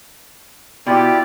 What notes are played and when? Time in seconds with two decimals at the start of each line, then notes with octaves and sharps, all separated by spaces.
0.87 B2 E4 F4 G4 D5